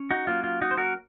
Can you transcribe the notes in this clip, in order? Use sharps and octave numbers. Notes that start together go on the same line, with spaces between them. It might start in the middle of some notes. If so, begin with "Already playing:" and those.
Already playing: C#4
D#4 F#4
F#3 A#3 C#4 F4
F4
D#4 F#4
C5
F#4 A#4